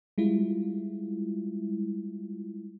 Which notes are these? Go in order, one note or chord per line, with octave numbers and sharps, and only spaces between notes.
G3 G#3 E4 F4